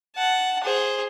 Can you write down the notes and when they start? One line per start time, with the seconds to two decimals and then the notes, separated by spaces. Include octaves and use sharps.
0.17 F#5 A5
0.64 G#4 C5